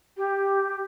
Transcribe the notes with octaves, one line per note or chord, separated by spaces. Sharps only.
G4